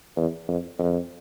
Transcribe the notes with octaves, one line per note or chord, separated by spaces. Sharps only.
E2
F2
F2